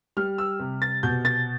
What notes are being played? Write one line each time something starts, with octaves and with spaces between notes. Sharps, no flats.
G3 F6
E6
C3
A6
B2 G6
A6